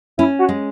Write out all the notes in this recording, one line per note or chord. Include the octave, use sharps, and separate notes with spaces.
C#4 E4
F#4
G#3